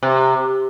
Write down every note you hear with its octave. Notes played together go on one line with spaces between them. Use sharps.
C3